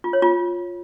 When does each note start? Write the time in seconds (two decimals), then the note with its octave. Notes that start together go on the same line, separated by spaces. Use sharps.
0.04 F4
0.13 C#5
0.22 F4